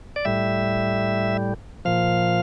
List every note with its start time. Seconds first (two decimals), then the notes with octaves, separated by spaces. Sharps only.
0.16 D5
0.25 A2 G3 E5
1.85 A#2 F3 F5